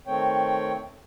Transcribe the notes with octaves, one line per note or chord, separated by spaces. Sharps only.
D#3 A3 C4 C#5 G5